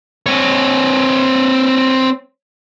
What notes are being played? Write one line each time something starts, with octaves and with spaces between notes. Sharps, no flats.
C4 C#5